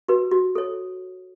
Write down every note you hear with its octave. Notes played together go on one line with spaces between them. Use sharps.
F#4 B4
F#4
A4 C#5